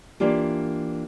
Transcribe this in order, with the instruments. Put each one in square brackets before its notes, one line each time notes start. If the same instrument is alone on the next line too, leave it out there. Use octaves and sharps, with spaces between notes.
[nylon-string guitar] E3 A#3 D4 F4 G4